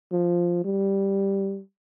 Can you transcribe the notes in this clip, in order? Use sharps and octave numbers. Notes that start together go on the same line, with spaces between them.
F3
G3